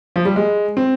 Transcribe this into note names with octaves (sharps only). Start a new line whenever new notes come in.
F3
G3
G#3
C4